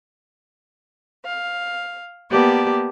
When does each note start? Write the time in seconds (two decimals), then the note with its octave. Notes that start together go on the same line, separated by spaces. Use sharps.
1.25 F5
2.31 A#3 B3 G4 D5 A5